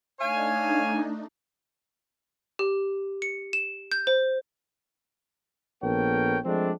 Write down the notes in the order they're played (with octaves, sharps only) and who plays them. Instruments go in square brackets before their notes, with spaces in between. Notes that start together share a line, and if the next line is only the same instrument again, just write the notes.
[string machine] A3 D4 D#4 [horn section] C#5 F5 G#5
[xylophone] G4
C#7
E7
G6
C5
[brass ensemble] A#1 B3 A4 A#4 C#5 G5
F3 G#3 A3 C4 D4